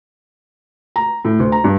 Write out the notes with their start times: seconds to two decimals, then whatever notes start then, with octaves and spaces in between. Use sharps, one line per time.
0.96 A#5
1.25 A2
1.39 D2
1.52 A#5
1.64 G2